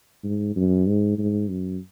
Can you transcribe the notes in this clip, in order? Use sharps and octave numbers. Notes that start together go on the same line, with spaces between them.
G#2
F#2
G#2
G#2
F#2